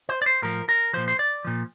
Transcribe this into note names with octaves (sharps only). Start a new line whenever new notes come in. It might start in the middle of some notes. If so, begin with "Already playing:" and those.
C5
D5
C5
A2 F3 A#4
A#4
A#2 F3 C5
C5
D5
A#2 F3